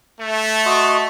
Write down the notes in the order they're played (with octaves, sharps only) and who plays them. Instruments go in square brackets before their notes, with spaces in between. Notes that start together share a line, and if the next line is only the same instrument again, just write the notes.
[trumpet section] A3
[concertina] F#4 D#5 C6